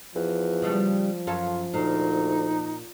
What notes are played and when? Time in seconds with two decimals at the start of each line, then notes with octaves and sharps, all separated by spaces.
0.15 E2 F3
0.62 C#3 G3 A3
1.27 F#2 F4 A4 C#5
1.74 D2 A#2 D#4